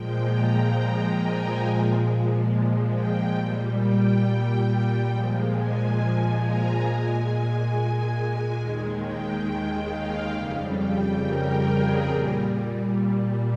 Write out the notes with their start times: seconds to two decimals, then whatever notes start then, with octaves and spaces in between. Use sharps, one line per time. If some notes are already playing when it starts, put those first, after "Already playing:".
Already playing: A#2 F3 G#3 G5
0.29 A#5
1.16 G#5
1.60 A#2 F3 G#3
2.90 G5
3.34 A#2 G3
3.78 G5
4.65 G5
5.09 A#2 F3 G#3
5.53 G#5
6.40 A#5
6.83 A#2 G#3 G#5
7.70 G#5
8.57 D#2 D#3 G#3
9.01 G5
9.89 F5
10.32 F2 C#3 G3
10.76 G5
11.19 A#4
11.64 G#4
12.07 A#2 G3